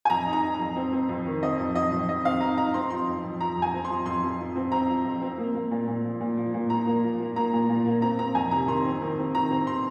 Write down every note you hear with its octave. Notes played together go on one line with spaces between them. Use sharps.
G#5
F2 A#5
D#4
A#5
D#4
F2 A#5
C4
C4
F2
D#3
C4 D#5
F2
F2 D#5
F2
F2 D#5
C4 F5
D#4 A#5
D#4 A#5
C4 C6
F3 C6
F2
F2
F3 A#5
F2
G#5
C4
C6
F3
F2 C6
F2
F3
C4
C4 A#5
F3
F2
C4
A#3
A#3
A#2
A#2
F3
A#2
F3
A#2
A#2 A#5
A#3
F3
A#3
A#3 A#5
A#2
A#2
A#3
C4 A#5
C4 A#5
F2 G#5
C3 A#5
D#3 C6
C4
D#3
C4
D#3 A#5
C4
C6